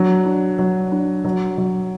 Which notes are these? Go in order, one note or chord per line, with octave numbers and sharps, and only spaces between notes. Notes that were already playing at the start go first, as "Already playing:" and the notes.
Already playing: F#3 D4
D4
F#3
D4
F#3
F#3